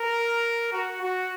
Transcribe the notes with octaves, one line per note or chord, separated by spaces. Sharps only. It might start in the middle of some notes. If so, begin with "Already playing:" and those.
Already playing: A#4
F#4
F#4